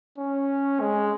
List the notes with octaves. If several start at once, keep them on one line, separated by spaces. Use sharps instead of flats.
C#4
G#3